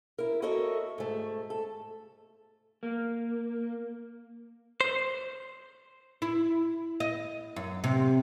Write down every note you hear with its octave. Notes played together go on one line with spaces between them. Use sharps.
E4 A#4
F#4 A4 A#4 C#5 D#5 E5
G#2 A3
A4
A#3
C5
E4
D#5
F#2
C3